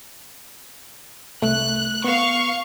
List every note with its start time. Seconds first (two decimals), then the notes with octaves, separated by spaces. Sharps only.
1.42 C2 A3 F#6
2.04 B3 F5 C#6